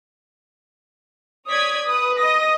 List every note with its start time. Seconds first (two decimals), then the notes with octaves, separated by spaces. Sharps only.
1.48 C#5 D5 D#6 G#6 B6
1.85 B4 D#6
2.20 D#5 D#6 A#6